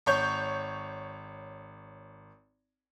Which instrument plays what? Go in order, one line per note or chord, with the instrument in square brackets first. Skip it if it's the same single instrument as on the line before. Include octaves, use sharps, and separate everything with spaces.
[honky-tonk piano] G#1 C#5 G6